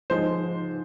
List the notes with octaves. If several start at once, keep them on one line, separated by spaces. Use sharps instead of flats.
G#2 F3 G#3 C5